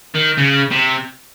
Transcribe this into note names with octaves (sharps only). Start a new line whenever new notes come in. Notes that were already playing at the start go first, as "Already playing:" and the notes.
D#3
C#3
C3